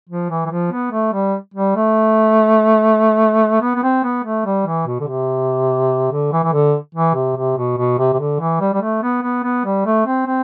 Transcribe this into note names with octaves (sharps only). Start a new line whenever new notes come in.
F3
E3
E3
F3
B3
A3
G3
G3
A3
B3
B3
C4
B3
A3
G3
E3
B2
D3
C3
D3
E3
E3
D3
E3
C3
C3
B2
B2
C3
C3
D3
E3
G3
G3
A3
B3
B3
B3
G3
A3
C4
C4